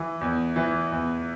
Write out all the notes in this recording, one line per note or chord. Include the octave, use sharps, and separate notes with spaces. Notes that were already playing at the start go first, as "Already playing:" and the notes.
Already playing: E3
E2
E3
E2